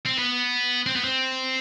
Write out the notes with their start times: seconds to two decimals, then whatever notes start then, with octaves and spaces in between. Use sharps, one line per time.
0.06 C4
0.18 B3
0.86 C4
0.96 B3
1.04 C4